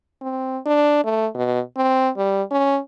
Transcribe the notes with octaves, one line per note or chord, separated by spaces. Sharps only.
C4
D4
A3
B2
C4
G3
C#4